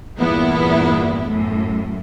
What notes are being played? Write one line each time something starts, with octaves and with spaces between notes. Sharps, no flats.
E2 G2 A#2 B3 E4
F#2 A2